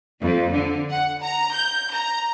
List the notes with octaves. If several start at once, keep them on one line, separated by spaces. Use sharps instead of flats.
F2
D3
F#5
A#5
G6
A#5